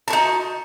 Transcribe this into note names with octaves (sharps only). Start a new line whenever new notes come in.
D#4 F#4 A5